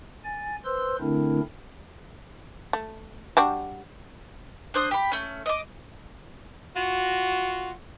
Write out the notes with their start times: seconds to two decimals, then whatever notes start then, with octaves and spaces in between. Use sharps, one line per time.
0.24 G#5 A6
0.65 B4 C5 C6 E6
1.00 D3 A3 C4 D4 E4 A#4
2.73 A3
3.37 G3 D4 F#4
4.74 D4 C5 D#6
4.91 G4 B5
5.12 A3 C#4
5.46 D#5 D6
6.76 F4 F#4